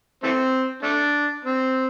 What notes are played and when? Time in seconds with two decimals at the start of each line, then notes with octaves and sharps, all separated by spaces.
0.23 E3 A3 C4
0.83 A3 D4
1.45 C4